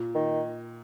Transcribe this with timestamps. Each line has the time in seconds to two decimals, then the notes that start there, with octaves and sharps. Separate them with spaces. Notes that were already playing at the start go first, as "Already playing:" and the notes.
Already playing: A#2
0.15 D#3